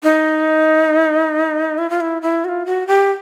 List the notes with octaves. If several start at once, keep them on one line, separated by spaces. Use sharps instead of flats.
D#4
E4
F4
E4
E4
F#4
F4
F#4
G4